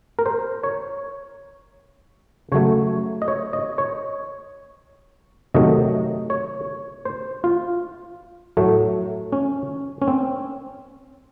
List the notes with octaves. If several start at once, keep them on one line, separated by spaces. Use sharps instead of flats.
A#4
C5
C#5
C#3 F#3 A3 C#5
D#5
C#5
D#5
C#5
C3 D#3 F#3 A3 D#5
C#5
C5
F4
A2 F#3 A3
C#4
C#4
C4